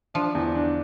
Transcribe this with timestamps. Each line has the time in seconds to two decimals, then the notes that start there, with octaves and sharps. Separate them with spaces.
0.14 F3 D4
0.35 E2
0.55 D4